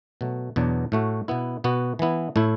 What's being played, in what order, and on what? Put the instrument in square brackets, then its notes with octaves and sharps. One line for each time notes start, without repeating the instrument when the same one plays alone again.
[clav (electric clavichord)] B2 F#3 A3
E2 B2 F#3 D4
A2 A3 F#4
B2 B3 E4
B2 B3 F#4
E3 B3 E4
A2 A3 E4